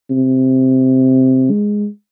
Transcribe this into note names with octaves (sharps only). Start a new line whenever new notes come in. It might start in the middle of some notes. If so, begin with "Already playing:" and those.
C3
G#3